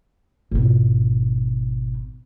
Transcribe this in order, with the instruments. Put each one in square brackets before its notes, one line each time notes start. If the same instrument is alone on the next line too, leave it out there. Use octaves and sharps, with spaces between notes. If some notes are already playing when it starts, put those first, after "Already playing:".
[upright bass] G#1 B2